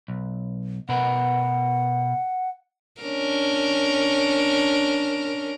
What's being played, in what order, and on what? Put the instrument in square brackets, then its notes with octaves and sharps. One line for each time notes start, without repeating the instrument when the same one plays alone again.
[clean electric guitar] B1
[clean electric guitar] B2 A#4 B4 [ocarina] F#5
[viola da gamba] C#4 D4 A#4